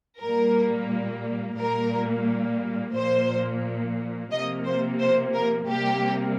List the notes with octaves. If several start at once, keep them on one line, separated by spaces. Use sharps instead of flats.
A#2 G3 A#3 A#4
A#2 G3 A#3 A#4
A#2 F3 A#3 C5
C3 F3 A#3 D#5
C5
C5
A#4
C3 G3 A#3 G4